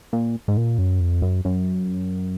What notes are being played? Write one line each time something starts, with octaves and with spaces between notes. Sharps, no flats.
A#2
G#2
A#2
F#2
F2
F#2
F#2